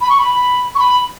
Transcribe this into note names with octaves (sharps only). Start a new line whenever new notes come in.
B5
C#6
B5
C#6
B5